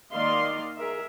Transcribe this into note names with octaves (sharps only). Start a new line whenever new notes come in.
D#3 A#3 D5 D#5 F5 C6
G#4 A#4 E5